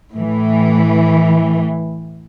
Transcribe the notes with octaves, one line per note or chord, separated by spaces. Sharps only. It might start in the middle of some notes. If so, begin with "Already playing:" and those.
A2 E3